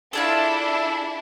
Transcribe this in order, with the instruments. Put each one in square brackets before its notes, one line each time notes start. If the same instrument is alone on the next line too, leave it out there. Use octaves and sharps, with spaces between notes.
[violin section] D4 E4 [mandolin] F4 G#4 A4